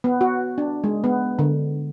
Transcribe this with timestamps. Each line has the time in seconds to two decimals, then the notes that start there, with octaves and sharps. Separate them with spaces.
0.04 B3
0.21 F#4
0.58 D4
0.84 G#3
1.04 B3
1.39 D3